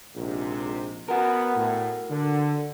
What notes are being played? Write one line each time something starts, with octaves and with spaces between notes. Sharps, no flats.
A#1 G#2 C3
B3 F#4 A#4
A2
D3